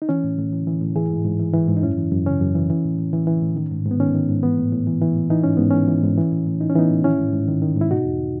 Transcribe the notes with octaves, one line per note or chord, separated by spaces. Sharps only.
D#4
E3 C#4
A2
A2
E3
E3
A2
E3 E4 G#4
G#2
G#2
E3
E3
G#2
D#4
F#2 C#4 E4
E3
F#2
C#3 C#4
F#2
E3
E3
A2
A2
E3
E3
A2
D#3
G#2
G#2
B3
D#3 C#4
D#3
G#2
E3 B3
A2
A2
E3
E3
A2
E3 D#4
G#2 C#4
G#2 B3
E3 C#4
E3
G#2
E3
A2
A2
E3 D#4
C#4
E3 B3 D#4
A2
D#3 C#4 E4
G#2
G#2
D#3
D#3
G#2 E4
B2 D#4 F#4
E2